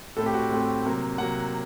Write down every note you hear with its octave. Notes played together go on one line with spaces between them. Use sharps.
A2 A3 C4 A4
G4
F#4
A2 A3 C4
C3 F#3 A#3
C3 F#3 A#3 F#5